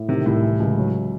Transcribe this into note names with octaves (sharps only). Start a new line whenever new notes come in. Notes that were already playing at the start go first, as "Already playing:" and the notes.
Already playing: A2
C3 D#3
C2 A2
E3
C#2
F#3